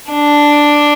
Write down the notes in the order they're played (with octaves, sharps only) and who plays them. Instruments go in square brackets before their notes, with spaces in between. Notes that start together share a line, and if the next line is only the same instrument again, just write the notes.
[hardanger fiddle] D4